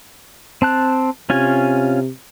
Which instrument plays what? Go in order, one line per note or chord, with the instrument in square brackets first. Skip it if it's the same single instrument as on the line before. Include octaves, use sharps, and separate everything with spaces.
[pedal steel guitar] C4 A5 F#6
[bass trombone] C3 [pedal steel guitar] C#4 F4 G#5